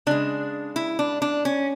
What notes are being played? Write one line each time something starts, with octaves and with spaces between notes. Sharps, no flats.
C#3 G#3 D4
E4
D4
D4
C#4